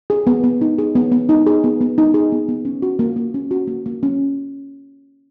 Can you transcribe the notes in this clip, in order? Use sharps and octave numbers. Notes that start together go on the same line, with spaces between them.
G#4
B3
B3
D#4
G#4
B3
B3
D#4
G#4
B3
B3
D#4
G#4
B3
B3
C#4
F#4
A#3
A#3
C#4
F#4
A#3
A#3
C#4